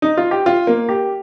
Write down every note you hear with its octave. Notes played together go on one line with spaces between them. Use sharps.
D#4
F4
G4
F4
A#3
G4